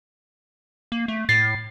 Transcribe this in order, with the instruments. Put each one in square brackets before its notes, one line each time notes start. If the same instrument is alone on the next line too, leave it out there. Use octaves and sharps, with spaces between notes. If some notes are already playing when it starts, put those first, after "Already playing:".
[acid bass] A#3
A3
[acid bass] A2 [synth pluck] A6 C7